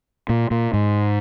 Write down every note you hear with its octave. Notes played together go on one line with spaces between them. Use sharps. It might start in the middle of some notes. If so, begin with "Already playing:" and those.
A#2
A#2
G#2